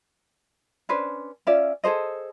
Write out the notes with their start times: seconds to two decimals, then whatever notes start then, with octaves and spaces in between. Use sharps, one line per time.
0.89 C#4 D4 B4 C5
1.47 C#4 F4 D5 E5
1.84 G#4 A4 C5 D#5